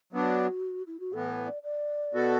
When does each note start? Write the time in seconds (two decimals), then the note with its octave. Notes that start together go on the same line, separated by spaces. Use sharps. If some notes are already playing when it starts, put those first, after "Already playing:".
0.12 F#3 B3 D4 F#4
0.87 E4
1.00 F#4
1.13 A2 E3 B3 A4
1.30 B4
1.47 D5
1.63 D5
2.13 B2 B3 F#4 A4